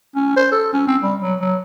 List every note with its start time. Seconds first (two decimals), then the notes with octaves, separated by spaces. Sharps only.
0.15 C#4
0.36 C5
0.52 A4
0.73 C#4
0.87 C4
1.02 G3
1.21 F#3
1.40 F#3